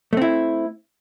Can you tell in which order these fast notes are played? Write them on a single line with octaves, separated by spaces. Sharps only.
A3 C4 E4